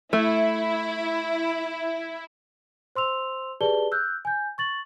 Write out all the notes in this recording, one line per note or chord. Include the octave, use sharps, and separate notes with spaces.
A3 E4
C5 C6 E6 F7
G4 G#4 B4 D5 A5 G7
E6 F#6 G6
G#5 G6
C#6 A6 F#7